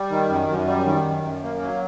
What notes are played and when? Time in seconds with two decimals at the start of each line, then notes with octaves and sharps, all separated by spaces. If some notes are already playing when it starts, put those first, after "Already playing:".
Already playing: G3
0.10 D#3
0.29 F#2
0.48 F#2
0.67 G3
0.86 D#3
1.05 F#2
1.24 F#2
1.43 A#3
1.62 F#3